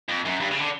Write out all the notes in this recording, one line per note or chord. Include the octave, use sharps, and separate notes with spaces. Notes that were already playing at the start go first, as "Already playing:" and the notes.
F2
F#2
G2
C#3
D3